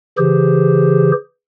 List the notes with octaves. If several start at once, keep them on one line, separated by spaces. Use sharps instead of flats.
C#3 E3 G4 G#4 C5